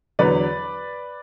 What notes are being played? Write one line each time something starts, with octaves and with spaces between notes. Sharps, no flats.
E2 D3 F#3 B4 D5